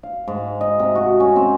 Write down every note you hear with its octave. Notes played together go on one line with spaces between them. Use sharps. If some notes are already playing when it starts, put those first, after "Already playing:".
F5
G#2
D#5
C3
F#4
C#4
C4